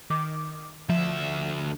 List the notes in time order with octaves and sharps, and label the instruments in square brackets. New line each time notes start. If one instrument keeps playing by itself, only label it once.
[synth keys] D#3 D6
[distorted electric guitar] D2 E5 [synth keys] F3